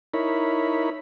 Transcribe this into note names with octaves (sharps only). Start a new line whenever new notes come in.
D#4 E4 A#4 C#5 B5